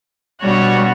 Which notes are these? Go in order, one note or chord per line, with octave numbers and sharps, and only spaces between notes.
B2 G3 D4 F#4 C#5